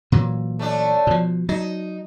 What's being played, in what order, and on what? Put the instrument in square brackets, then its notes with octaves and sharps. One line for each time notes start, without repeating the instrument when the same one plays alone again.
[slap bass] A#2 E3 F#3
[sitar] A3 C#4 D4
[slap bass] B2 F3
[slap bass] F#3 [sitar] D#4